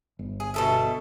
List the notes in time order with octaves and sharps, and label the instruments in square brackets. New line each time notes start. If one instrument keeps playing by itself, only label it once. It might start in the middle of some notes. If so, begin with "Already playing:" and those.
[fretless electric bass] G1
[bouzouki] G#4
B2 A4 E5